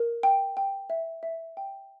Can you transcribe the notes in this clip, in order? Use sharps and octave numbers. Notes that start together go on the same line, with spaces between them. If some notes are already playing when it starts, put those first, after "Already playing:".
Already playing: A#4
G5
G5
E5
E5
G5